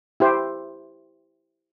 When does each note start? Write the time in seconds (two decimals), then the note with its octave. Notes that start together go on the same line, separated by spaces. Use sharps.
0.20 E4 G4 C5